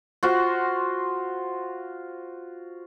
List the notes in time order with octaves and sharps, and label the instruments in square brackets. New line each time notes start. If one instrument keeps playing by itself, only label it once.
[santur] F4 F#4 C5